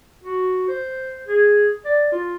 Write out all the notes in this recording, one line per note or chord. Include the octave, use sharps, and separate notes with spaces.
F#4
C5
G#4
D5
F4